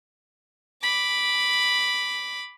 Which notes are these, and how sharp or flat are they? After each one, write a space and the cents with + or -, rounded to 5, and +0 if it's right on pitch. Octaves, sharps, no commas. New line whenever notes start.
B5 +0 D6 +0